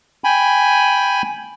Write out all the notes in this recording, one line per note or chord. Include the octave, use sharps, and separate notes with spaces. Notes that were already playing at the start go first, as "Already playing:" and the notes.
G5 G#5 B5